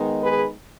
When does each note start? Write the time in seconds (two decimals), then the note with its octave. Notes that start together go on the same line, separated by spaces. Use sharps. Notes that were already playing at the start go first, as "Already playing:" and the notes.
Already playing: D#3 G#3 B3 D#4
0.20 G#4 B4